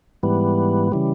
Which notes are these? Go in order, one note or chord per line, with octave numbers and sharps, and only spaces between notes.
G#2 E3 G3 B3
C#3 E3 G3